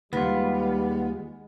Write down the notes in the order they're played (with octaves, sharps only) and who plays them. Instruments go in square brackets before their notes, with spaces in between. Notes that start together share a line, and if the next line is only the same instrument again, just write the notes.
[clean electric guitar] D#2 F4 [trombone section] G3 [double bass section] G#3 [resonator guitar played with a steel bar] B3